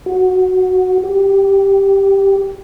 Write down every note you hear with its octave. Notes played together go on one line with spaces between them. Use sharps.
F#4
G4